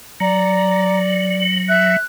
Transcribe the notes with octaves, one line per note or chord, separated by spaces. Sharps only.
F#3 D5 A#5
F#7
E5 F#6